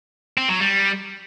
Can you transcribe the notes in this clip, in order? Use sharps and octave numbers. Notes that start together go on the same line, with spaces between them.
C4
F#3
G3